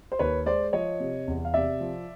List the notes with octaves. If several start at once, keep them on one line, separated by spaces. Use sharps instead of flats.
C5
D#2 B4 C#5
G#3 C5 D5
F3 C#5 D#5
C3
E2
F5
C3 D5 E5
F3